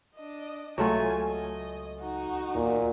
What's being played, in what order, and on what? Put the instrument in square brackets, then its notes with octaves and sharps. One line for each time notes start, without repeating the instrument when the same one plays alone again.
[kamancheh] D4 D#5
[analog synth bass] C#2 [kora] F#3 A3 F4 [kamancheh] G#5
[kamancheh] D#5
D#4 F#4
[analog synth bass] E2 [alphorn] A#2